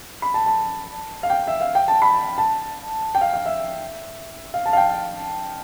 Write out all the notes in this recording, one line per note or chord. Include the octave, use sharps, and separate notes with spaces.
B5
A5
A5
F5
G5
E5
F5
G5
A5
B5
A5
G5
F5
F5
E5
F5
A5
F5
G5
F5